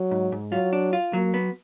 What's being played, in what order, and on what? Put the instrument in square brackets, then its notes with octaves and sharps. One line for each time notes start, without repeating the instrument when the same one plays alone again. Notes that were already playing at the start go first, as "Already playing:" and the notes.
Already playing: [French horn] F#3
[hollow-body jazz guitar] G#2
G#2
[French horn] F#3 [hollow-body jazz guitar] F4
[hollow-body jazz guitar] D4
F4
[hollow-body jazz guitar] F#3 [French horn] A#3
[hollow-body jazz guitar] B3